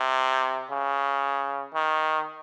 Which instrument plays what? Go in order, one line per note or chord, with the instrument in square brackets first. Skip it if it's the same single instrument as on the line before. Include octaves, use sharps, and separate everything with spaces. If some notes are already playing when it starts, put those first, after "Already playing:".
Already playing: [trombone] C3
C#3
D#3